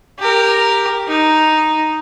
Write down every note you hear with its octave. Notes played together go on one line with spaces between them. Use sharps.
G4 A#4
D#4